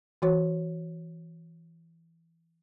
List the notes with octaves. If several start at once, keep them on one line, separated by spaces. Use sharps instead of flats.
E3 F#4 C#5